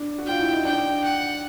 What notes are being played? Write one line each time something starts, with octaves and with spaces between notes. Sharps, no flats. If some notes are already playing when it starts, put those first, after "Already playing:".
Already playing: D4
F#4
F4 G5
E4
D#4
D4 G5
F#5